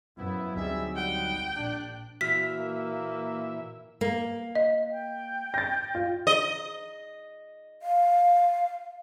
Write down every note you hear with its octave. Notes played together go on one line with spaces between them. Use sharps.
F#2 F3 B3 E4
D2 F#3 G3 C4 D#4 G#4 E5
G3 F#5 G5
A#1 D4 F#6
A#2 E3 F#4 E5 F6 B6
A#3
A#3
D#5
G5
A6 A#6
F4
D#5
F5